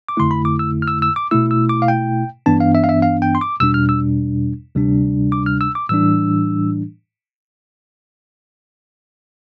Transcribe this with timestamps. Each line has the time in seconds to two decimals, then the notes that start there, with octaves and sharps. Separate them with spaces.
0.09 D6
0.17 F2 D3 A3 E4 C6
0.31 B5
0.45 D6
0.59 E6
0.82 F6
0.88 E6
1.02 E6
1.16 D6
1.31 B2 A3 E4 E6
1.51 E6
1.69 D6
1.82 F5
1.88 G5
2.46 G2 E3 B3 D4 A5
2.60 F5
2.75 E5
2.84 F5
2.89 E5
3.02 F5
3.22 G5
3.35 C6
3.41 D6
3.60 E2 B2 G3 D4 E6
3.74 F6
3.89 E6
4.75 D2 C3 G3 D4
5.32 D6
5.46 F6
5.61 E6
5.75 D6
5.89 A2 E3 G3 D4 E6